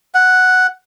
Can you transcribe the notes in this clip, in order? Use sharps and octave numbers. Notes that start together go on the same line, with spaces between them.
F#5